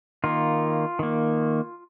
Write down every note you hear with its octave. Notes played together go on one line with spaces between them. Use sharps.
D#3 A#3 F4
D#3 A#3